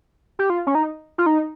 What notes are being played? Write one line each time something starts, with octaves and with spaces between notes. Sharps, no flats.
G4
F4
C#4
D#4
F4
D#4